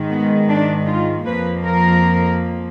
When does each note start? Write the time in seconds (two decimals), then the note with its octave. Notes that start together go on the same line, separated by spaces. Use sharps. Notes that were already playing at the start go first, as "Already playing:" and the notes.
Already playing: G#2 D#3 G#3
0.10 B3
0.49 D4
0.87 F4
1.25 F2 F3 A#3 B4
1.65 A#4